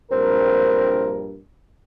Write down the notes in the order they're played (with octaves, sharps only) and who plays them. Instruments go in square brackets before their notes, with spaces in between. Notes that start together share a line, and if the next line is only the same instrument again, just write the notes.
[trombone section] A#1 G2 A#4 [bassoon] C4